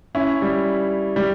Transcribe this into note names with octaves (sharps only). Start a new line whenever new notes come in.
C#4 E4
G3
G3